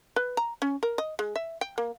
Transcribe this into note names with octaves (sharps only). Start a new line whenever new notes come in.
B4
A#5
C#4
A#4
D#5
G#3
E5
G5
A#3